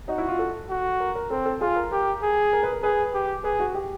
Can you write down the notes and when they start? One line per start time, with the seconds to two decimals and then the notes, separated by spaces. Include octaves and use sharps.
0.08 D#4 F#4
0.18 E4
0.28 F4
0.39 A4
0.70 F#4
1.00 A#4
1.15 A#4
1.30 C4 A4
1.46 A4
1.61 F4 G#4
1.76 A#4
1.91 G4 A#4
2.22 G#4
2.53 A#4
2.63 B4
2.73 A#4
2.82 G#4 B4
3.14 G4
3.44 G#4 B4
3.60 F#4
3.74 G4